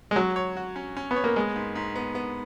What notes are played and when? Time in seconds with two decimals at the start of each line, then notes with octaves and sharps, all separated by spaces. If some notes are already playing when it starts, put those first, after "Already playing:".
0.11 G#3
0.16 F#3 C#5
0.36 C#5
0.57 F#4
0.76 C#4
0.97 C#4
1.11 B3
1.16 C#5
1.24 A#3
1.36 G#3 B3
1.56 G#2
1.76 G#2
1.96 B3
2.15 B3